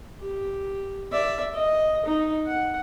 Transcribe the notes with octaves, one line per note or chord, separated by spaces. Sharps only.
G4
D5 E5
D#5
D#4
F#5